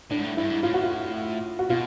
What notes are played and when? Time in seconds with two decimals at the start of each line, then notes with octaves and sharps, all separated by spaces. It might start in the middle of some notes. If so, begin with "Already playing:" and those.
0.10 A2 D4
0.18 G#2
0.24 A2
0.37 G2 E4
0.50 G#2
0.63 A2 F4
0.74 F#4
0.84 F4
1.59 F#4
1.70 B2 F4